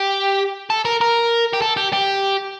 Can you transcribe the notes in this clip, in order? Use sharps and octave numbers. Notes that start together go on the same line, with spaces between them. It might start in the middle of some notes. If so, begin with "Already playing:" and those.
Already playing: G4
A4
A#4
A#4
G4
A4
G4
G4